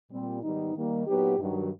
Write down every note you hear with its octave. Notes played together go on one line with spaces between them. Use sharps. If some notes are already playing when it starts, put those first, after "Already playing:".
A#2 G3 C4
G#2 D#3 G3 B3 D#4
D#3 G3 A#3
A#2 F#3 B3 D#4 G4
G2 D#3 F#3